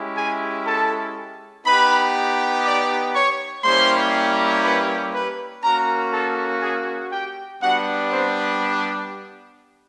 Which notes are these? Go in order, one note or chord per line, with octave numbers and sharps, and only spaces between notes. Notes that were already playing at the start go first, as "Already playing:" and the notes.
Already playing: G#3 C#4 E4 G4
G#4 G#5
A4 A5
B3 D#4 G4 B4 B5
D5 D6
C#5 C#6
G3 A#3 C#4 E4 G4 C5 C6
B4 B5
B4 B5
A#3 C#4 F#4 A#4 A#5
A4 A5
G#4 G#5
G4 G5
G3 B3 D4 F#4 F#5
C4 C5